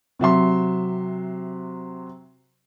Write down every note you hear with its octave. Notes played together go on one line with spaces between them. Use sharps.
C3 F#3 E5 C6